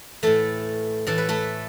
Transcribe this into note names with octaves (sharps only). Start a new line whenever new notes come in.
A2 E3 A3 A4
A2 E3 A4
B4
A3 A4